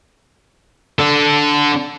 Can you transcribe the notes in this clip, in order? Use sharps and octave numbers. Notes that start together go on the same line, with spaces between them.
D4 A4